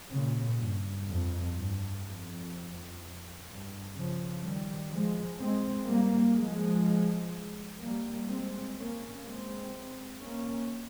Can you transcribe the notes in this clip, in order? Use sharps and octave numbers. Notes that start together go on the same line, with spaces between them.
A#2 C#3
G2
F2
G2
F2
G2
C#3 F3
D#3 G3
F3 G#3
G#3 C4
G3 A#3
F3 G#3
G3 A#3
G#3 C4
A#3 C#4
G#3 C4
A#3 C#4